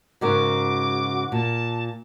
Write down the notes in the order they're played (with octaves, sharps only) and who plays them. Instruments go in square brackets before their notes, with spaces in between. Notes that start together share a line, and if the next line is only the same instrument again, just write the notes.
[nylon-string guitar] G#2 C#3 A#4 [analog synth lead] F#4 [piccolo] D6
[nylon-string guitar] A#2 [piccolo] A5